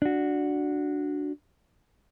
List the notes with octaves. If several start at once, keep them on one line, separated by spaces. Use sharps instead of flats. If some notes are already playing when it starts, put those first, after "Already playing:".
D4 F#4